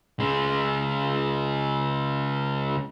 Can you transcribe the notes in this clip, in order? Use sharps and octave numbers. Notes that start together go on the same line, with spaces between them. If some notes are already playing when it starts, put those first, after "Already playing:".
C#3 G#3